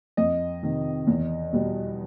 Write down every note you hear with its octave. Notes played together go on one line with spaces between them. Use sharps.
F2 D#5
C3 D#3
E2
B2 G3